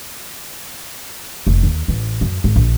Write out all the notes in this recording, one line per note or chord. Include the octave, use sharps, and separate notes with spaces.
F1
D#2
A1
F#2
G#1
A#1